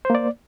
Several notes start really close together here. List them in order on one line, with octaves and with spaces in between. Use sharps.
C5 A#3 D5